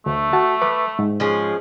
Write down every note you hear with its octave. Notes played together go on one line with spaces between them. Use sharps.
D2 A3
F#4 A5
B4 B5 D6
G#2
F3 G#3 C#4